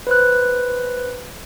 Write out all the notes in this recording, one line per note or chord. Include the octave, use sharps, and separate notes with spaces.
B4 C5 F#6